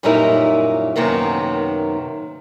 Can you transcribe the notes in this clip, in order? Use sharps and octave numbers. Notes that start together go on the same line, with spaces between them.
F#2 A#2 G3 D#4 E4 A#4
F#2 C3 D#3 A#3 B3